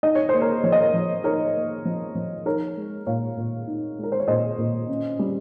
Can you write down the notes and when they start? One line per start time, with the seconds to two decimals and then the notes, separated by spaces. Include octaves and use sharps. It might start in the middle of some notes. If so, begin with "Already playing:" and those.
0.03 D#4 D#5
0.15 C#5
0.29 A#3 C5
0.41 A#4 C#5
0.64 F3 C#5
0.72 D#5
0.80 A#4 C#5
0.94 F3
1.24 D#4 A#4 C#5
1.55 A#3
1.85 F3
2.15 F3
2.45 D#4 A#4 C#5
2.76 G#3
3.07 A#2 C#5 F5
3.37 A#2
3.67 D#4
3.98 G#3
4.03 A#4
4.12 C5
4.20 C#5
4.28 A#2 C5 D#5
4.58 A#2
4.89 C#4
5.19 G3